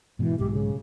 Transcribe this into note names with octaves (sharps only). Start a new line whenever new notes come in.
G#2 B2 E3
B1 G#2 G#3 G4
C#3